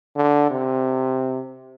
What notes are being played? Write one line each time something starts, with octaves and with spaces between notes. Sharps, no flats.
D3
C3